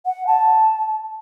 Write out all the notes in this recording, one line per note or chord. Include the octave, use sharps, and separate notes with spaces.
F#5
A5